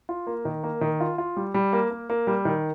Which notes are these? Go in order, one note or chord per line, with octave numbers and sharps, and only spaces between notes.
F4
A#3
D#3
A#3
D#3
F4
F4
G3
G3
A#3
A#3
A#3
G3
D#3